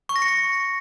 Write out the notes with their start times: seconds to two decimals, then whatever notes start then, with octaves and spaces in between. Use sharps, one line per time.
0.09 C#6
0.16 A#6
0.22 C#7
0.28 A#6